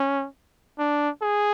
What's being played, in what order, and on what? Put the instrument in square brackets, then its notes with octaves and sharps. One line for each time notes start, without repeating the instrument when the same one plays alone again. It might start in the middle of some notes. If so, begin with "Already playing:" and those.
Already playing: [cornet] C#4
D4
G#4